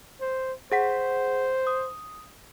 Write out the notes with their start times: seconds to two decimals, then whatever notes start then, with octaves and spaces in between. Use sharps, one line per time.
0.21 C5
0.72 G#4 C5 F#5 B6
1.67 D#6